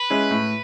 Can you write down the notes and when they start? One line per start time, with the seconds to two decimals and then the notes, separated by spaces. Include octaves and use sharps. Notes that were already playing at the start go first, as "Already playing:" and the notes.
Already playing: B4
0.10 G#3 C#4 E4 G#4
0.31 A2